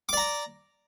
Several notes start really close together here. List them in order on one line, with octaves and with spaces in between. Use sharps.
D6 D5 A#5